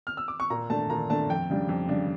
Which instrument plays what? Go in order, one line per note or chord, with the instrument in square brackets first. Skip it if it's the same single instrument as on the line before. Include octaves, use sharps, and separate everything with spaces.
[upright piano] F6
E6
D6
C#6
A#2 A#5
A3 D4 A5
A#2 A#5
A3 D4 A5
F2 G5
C#3 G3 D4
F2
C#3 G3 D4